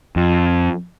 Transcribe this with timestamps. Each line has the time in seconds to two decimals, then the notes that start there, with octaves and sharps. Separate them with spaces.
0.16 F2